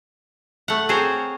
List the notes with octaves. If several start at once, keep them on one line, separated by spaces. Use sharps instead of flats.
A3 F#5
C4 G#4 A#4 C5 C#5